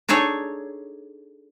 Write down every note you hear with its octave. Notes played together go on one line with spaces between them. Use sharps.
D4 D#4 G#4 A4 C#5